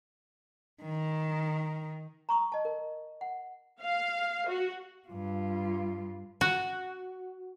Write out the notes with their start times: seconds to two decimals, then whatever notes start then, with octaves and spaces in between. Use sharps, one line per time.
0.83 D#3
2.29 A#5 C#6 D#6
2.52 D#5 A5
2.65 A#4
3.21 F#5
3.82 F5
4.48 F#4
5.08 G2 F4
6.41 F#4